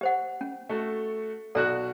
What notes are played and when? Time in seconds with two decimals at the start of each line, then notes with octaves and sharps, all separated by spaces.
0.01 G4 C5 F#5
0.41 C#4
0.69 A3 F#4 A4
1.55 B1 F#4 A4 D5 F#6